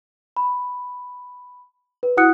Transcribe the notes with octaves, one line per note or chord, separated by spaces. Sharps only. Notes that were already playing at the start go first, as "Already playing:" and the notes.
B5
B4
E4 F#4 F#5 D#6 F#6 C#7